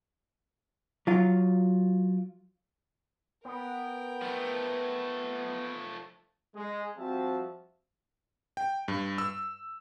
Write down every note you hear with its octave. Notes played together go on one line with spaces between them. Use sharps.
F#3 F4
B3 A#4 G5
F3 A3
G#3
F3 G3 C4 F#4 E5 A5
G5
G2
E6